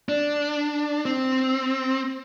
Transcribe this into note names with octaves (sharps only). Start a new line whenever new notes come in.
D4
C4